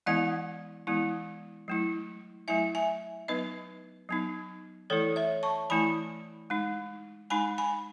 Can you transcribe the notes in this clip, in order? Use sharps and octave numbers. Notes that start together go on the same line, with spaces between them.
E3 G#3 B3 E4 D#5 F#5
E3 G#3 B3 E4
F#3 A3 E4
F#3 A3 E4 E5 G#5
E5 G#5
F#3 B3 D#4 B4 D#5
F#3 B3 D#4
E3 A3 E4 A4 C#5
C#5 E5
A5 C#6
E3 A3 E4 G#5 B5
G#3 D#4
G#3 D#4 G#5 B5
G#5 B5